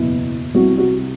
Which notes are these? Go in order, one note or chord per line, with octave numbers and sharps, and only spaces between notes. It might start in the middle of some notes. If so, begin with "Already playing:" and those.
Already playing: F#1 E2 B2 E4
C2 C3 G3 F#4
F#4